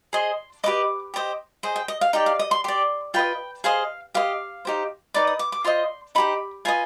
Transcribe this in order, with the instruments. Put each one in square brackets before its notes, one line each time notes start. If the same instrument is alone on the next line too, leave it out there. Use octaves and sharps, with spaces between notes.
[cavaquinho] G#4 C5 D#5 C6
G4 B4 D#5 D6
G4 C5 D#5
G#4 C5 D#5
G5
D#5
F5
D#4 G4 D5 G5
F5
D#5
C6
G4 D5 C6
F4 B4 D#5 G5
G#4 C5 D#5 F5
G4 C5 D#5 F5
D#4 G4 C5
D#4 B4 D5 D6
D#6
D6
D6
F4 C5 D#5 C6
D#4 G4 C5 B5
F4 B4 D#5 G#5